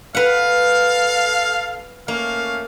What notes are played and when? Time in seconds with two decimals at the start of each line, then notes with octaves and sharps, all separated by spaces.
0.15 A4 B4 F5 F#5
2.08 A3 A#3 C#4 F5